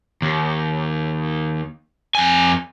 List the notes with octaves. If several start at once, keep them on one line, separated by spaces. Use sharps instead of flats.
D#2
F2 G#5